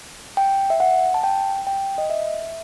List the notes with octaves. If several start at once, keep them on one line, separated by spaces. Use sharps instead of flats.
G5
E5
F#5
A5
G5
G5
D#5
E5